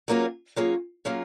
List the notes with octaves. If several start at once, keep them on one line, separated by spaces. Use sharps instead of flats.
F#3 A#3 C#4 F4 G#4
F#3 A#3 C#4 F4 G#4
F#3 A#3 C#4 F4 G#4